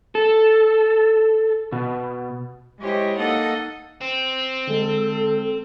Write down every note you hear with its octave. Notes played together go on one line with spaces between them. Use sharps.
A4
B2
G#3 E4 G4 C5 C#5 D#5
A#3 D#4 A4 D#5 F#5 D#6
C4
D3 G#3 A4